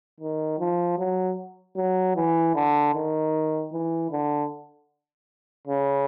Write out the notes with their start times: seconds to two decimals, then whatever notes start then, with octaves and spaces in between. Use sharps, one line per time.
0.20 D#3
0.59 F3
0.98 F#3
1.77 F#3
2.16 E3
2.55 D3
2.94 D#3
3.72 E3
4.11 D3
5.67 C#3